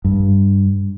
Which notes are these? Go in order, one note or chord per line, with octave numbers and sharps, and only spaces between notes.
G2